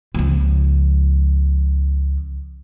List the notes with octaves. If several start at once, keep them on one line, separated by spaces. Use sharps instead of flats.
C#2 F3